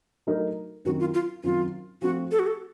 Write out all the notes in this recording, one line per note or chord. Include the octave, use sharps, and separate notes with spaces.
F#3 A3 D#4 A#4
F#2 D#3 F#3 C4 F#4
F4
F4
F#2 D#3 F#3 C4 F4
F3 A3 C4 F#4
A4
F#4
A4